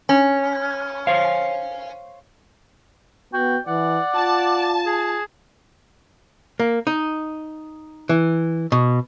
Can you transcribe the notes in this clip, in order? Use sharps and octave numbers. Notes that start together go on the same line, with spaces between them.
C#4
C5 C#5 F5
B3 F#4 G5
E3 D5 F#5
F4 A5
G#4
A#3
D#4
E3
B2